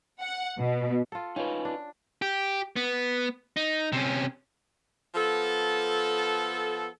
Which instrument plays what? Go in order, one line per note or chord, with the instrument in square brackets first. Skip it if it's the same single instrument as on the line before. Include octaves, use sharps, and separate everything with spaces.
[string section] F#5
B2
[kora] F4 A4
[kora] C#4 [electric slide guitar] D#4 F4 B4
[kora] D4
[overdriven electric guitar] G4
B3
D#4
C3 C#4
[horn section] F3 B3 A4